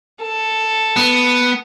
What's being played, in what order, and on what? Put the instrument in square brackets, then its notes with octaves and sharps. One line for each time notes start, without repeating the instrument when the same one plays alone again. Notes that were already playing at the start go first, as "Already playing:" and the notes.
[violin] A4
[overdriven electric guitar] B3